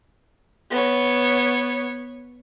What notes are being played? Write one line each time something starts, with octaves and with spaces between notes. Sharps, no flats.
B3 C#5